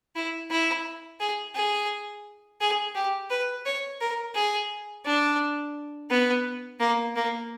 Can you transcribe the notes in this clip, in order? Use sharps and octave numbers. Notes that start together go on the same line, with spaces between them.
E4
E4
G#4
G#4
G#4
G4
B4
C#5
A#4
G#4
D4
B3
A#3
A#3